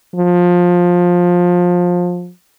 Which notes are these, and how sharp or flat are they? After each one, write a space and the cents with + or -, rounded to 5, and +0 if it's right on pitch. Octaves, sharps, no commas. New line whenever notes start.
F3 +20